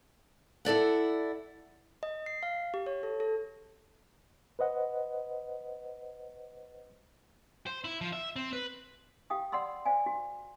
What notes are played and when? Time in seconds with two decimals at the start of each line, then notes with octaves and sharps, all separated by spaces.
0.65 E4 A4 D5 F#5
2.03 D#5
2.26 C7
2.43 F5
2.74 G4
2.86 C#5
3.03 A4
3.20 A4
4.59 B4 C5 D#5 F#5
7.67 C5
7.84 E4
8.01 F3
8.13 E5
8.36 C4
8.53 B4
9.30 G4 F5 G5 D#6
9.52 D5 F#5 B5 C6 E6
9.85 C5 D5 F5 G#5
10.06 F#4